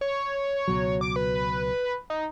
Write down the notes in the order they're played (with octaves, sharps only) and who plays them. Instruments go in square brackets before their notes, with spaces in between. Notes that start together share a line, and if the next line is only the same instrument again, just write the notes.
[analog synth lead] C#5
[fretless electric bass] C#2 B2 F#3
[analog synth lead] D6
B4
D#4